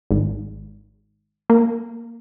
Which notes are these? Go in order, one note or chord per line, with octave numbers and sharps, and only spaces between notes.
G#1
A#3